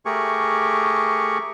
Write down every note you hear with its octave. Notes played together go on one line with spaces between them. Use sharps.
A3 G4 G#4 A#4 C#6